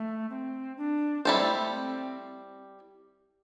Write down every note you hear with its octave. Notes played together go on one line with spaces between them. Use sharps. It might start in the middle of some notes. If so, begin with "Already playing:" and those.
Already playing: A3
C4
D4
G3 C4 E4 A4 C5
A3
A3
C4